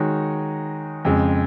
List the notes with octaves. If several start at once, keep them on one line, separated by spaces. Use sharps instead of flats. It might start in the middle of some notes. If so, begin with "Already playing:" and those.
Already playing: D#3 G#3 D#4 F#4 C#5
F2 C#3 G#3